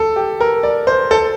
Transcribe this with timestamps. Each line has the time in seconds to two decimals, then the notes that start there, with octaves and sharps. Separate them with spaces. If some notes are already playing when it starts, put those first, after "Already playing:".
Already playing: A4
0.16 G4
0.40 A#4
0.63 D5
0.87 C5
1.11 A4